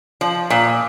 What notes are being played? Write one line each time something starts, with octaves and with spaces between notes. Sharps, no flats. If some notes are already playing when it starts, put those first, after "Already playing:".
F3
A#2